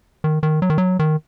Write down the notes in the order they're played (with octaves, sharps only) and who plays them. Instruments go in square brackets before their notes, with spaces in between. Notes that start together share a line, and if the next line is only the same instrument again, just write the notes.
[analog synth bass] D#3
D#3
F#3
D#3
F#3
D#3